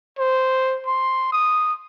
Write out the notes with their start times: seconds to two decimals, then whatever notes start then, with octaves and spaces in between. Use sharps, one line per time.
0.19 C5
0.86 C6
1.32 D#6